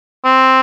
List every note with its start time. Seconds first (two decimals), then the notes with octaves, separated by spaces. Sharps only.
0.24 C4